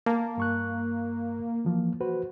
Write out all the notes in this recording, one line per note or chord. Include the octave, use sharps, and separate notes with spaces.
A#3 A5
G2 C#6 F#6
E3 F3 A#3
F#4 B4 C5